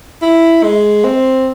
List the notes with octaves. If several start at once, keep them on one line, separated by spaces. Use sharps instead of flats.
E4
G#3
C4